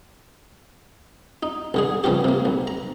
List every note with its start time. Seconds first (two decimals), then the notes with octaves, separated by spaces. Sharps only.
1.43 D#4
1.74 B1 D3 G#4
2.04 G2 C#3 F3 C#4 G4
2.24 C3 A#3
2.45 B1
2.67 A#5